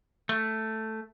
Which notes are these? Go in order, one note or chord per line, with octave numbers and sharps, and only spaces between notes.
A3